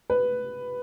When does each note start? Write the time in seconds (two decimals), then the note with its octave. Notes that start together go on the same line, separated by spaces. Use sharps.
0.10 B4